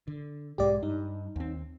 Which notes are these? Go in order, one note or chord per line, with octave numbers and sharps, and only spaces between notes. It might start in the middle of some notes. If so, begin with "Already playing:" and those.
D3
B1 G#2 G#3 G4 D5
G2 D#4
D#2 C4